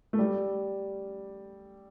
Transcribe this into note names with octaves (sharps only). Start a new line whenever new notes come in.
A3
G3